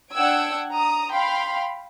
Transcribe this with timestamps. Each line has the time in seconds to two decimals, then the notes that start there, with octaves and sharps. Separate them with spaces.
0.13 D4 F#5 G5 E6 G#6 D7
0.72 A#5 D#6
1.12 F5 G5 B5 C6